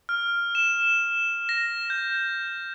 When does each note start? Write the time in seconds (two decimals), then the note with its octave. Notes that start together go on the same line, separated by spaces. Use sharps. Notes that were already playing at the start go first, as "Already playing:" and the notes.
0.09 F6
0.55 E7
1.49 A#6
1.90 G6